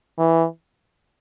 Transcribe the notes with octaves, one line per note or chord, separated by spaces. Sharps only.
E3